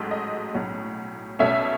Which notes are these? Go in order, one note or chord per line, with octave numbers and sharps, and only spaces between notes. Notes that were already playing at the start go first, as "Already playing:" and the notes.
Already playing: A1 G#2 F#3 A3
D#5
B1 A2 F#3 C#4
B1 B2 A3 C#4 E5